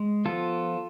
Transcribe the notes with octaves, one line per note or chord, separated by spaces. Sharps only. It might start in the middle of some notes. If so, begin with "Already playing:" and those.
Already playing: G#3
F3 B3 F4 A4